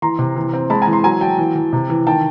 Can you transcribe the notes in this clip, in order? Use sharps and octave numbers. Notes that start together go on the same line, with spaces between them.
E3 A#5 C6
C3
E3
C4
G#3 A5 B5
G#5 A#5
E3
A#5 C6
F#3 G#5 A#5
F#3 G5 A5
E3
E3
C3
E3
D#3 G5 A5